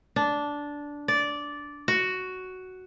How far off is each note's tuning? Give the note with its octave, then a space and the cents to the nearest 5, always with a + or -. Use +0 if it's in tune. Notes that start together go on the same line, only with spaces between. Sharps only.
D4 -10
D5 -10
F#4 +5